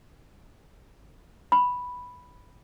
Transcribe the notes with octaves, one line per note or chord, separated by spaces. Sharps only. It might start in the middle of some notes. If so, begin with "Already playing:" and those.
B5